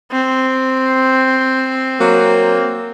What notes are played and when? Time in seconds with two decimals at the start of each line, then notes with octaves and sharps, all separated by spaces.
0.12 C4
1.99 F#3 A#3